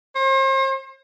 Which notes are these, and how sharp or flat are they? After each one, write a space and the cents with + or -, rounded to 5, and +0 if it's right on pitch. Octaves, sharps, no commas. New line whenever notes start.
C5 +40